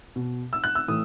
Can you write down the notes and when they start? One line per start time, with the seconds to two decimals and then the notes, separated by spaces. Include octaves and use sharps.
0.16 B2
0.53 E6
0.64 F#6
0.75 E6
0.88 A2 E3 D#6